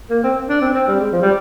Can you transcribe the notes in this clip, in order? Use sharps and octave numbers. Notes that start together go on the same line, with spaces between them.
A#3
C4
D4
C4
C4
G3
G#3
F3
G3